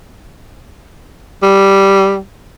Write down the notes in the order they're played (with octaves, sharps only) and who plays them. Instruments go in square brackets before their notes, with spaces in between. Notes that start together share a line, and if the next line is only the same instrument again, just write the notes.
[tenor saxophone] G3